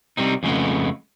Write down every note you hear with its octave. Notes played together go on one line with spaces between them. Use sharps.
C3 D#3 G3 C4 D#4
F2 C#3 G#3 A3 B3